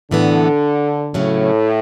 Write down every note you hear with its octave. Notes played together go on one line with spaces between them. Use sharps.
A2 D3 E3 B3
A2 C#3 F#3 A3 C#4